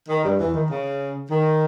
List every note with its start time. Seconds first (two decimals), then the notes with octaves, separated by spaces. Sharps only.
0.09 D#3
0.24 G2 G3
0.39 E2 E3
0.54 D#3
0.70 C#3
1.30 D#3